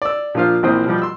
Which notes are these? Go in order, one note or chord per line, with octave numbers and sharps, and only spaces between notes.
D5 E6
A#2 F3 D4 F4 C5 F5
A#1 E3 A#3 C4 C5 D#6
B2 F3 G3
C6 E6